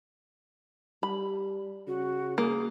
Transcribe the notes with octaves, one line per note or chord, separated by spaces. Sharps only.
G3 B5
C#3 F#4
A#3 G#4